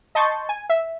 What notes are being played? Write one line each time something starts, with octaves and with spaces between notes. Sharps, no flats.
D#5 A5 C6 C#6 G6 A6
G#5
E5